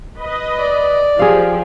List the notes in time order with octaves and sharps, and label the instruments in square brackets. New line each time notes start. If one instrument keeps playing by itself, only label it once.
[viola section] B4 D#5
[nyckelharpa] D5
[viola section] F3 G4 [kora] G#4 F5